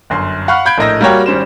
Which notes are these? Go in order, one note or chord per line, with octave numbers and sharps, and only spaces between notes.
G1 F#2 C6
F5 F#5 B5 C#6 F6 F#6
F5 B5 G6 G#6 D7
A#1 A2 A#4 D#5 E6 A#6
G3 A#3 F#4 A#4 C#5 G5
G#1 G3 C#4 C5 E7